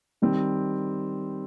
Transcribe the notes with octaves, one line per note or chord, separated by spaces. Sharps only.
D#3 G3 C4